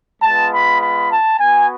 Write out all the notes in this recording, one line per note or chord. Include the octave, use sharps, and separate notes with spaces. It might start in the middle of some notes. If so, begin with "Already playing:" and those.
G#3 B3 F4 A5
B5
B5
A5
B3 F#4 G#5